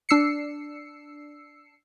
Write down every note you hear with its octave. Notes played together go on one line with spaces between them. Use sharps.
D4 E6 C7 C#7